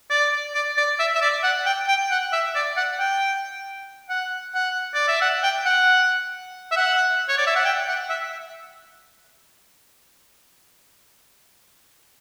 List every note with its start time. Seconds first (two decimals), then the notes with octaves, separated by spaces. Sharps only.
0.10 D5
0.54 D5
0.77 D5
0.99 E5
1.15 E5
1.21 D5
1.43 F#5
1.66 G5
1.88 G5
2.11 F#5
2.33 E5
2.55 D5
2.77 F#5
2.99 G5
4.10 F#5
4.55 F#5
4.94 D5
5.08 E5
5.21 F#5
5.43 G5
5.66 F#5
6.71 E5
6.77 F#5
7.29 C#5
7.38 D5
7.47 E5
7.56 F#5
7.65 G5
7.88 F#5
8.09 E5